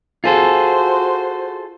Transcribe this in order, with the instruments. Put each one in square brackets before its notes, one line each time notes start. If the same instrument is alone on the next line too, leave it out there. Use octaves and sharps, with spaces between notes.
[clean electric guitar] F4 G#4 A4 [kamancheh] F#4 C5